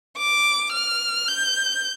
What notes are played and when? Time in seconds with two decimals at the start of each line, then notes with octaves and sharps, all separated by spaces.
0.17 D6
0.73 F6
1.28 G6